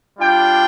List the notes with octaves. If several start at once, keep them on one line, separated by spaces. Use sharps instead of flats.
G3 D4 F4 G5